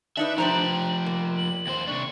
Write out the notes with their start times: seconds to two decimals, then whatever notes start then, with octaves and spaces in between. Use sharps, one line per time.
0.17 D4 D#4 B4 E5 F#7
0.38 F3 D4 G4 C5 A#5
1.06 A#3
1.37 F#7
1.67 D#2 C5
1.87 C3 D4 C#6